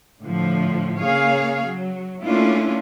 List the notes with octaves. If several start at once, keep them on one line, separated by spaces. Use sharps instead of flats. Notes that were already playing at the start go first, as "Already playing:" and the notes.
A2 D3 F3
C#3 A#3 G#4 C#5 F5
F#3
A3 A#3 C#4 D4 E4 F4